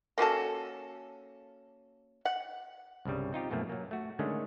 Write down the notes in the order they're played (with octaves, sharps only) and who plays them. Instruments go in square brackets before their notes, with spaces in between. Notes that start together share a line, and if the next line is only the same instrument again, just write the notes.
[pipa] A#3 C#4 F#4 A4
F#5
[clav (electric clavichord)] C2 G2 C#3 G3
C4 D#4 F4 G4
F#2 B2 F3 A3 A#3
F#3 A#3
A3 F#4
D3 D#3 G#3 A3 C#4